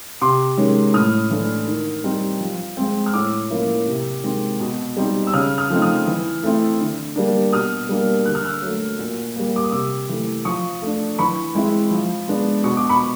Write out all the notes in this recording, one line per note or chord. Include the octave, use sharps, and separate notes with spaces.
C3 C6 D6
D#3 G#3 C#4
A2 D#6 F6
E3 A3 D4
D#3
G3 C4 D#4
F3
G#3 C4
F6
A2 D6 E6
F3 A#3 C#4 E4
C3
D#3 G#3 C4
B2
G3 C4 D#4
E6
C#3 D#6 F6
D#6 F6
F3 A3 C4 D#4
D#6 F6
E3
A3 C4 E4
D3
G3 A#3 D4
B2 D#6 F6
G3 A#3 D4
D3 F#6
F6
E6 F#6
F#3 A3
A#2
G3 A#3
D6
D#6
C3 D6 E6
E3 A3
F3 C#6 D#6
A3 D4
E3 B5 C#6
G#3 C4 E4
F3
G#3 B3 D4
B2 C#6
D6
B5 C#6